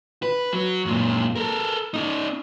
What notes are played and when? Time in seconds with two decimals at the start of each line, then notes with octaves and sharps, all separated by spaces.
0.23 B4
0.53 F#3
0.86 F#2 A#2
1.36 A4 A#4
1.94 C#4 D#4